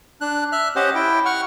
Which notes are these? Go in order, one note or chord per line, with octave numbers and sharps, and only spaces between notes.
D4 F#6
E5 F6 F#6
C#4 G4 C5 D#5 F#5
E4 G5
F#5 C#6 F6